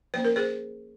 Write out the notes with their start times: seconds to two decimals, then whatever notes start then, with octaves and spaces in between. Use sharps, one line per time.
0.14 F3 A#3 C#4 C5
0.25 A#4
0.36 G#4 C5